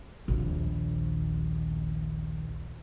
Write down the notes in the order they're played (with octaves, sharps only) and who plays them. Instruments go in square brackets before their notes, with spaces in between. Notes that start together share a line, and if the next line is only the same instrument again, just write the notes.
[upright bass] A#1 D#2